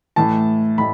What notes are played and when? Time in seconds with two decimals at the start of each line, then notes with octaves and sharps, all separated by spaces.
0.16 A2 E3 A5
0.78 A2 B5